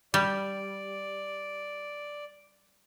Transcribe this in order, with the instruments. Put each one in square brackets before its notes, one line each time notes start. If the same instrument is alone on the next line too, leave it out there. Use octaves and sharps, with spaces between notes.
[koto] G3 [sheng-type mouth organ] D5